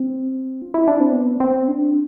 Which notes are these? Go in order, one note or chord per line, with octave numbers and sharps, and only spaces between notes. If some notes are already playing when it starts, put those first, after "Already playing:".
Already playing: C4
F4
E4
D4
C4
B3
C4
D4